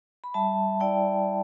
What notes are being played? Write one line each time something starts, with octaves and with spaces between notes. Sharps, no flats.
B5
G3 E5 A5
E4 D5 G5